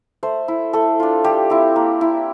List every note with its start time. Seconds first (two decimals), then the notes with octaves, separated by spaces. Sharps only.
0.23 A3 C5
0.48 E4
0.73 A3 A4
1.00 D4 F4
1.24 G3 G4
1.50 C4 E4
1.76 A#3
2.01 E4